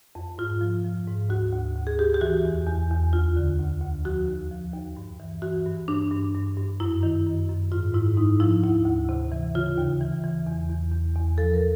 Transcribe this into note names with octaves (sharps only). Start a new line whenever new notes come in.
F2
G#2 F4
F3
F3
G#2
D2 F#4
D2
D2
G#4
D2 G4
G4
E3 F#4
E2
E2
E2
D2 F4
D3
D2
D2
F3 F#4
D#2
F3
D#2
G2
E3
E3 F#4
G2
G2 D4
G2
G2
G2
F#2 E4
D#3
F#2
F#2
G#2 F4
G#2 E4
G#2 D#4
F3 E4
D2 E4
D2
C3
E3
C#3 F4
D#2
E3
E3
E2
E2
E2
E2
F3 A4
A#4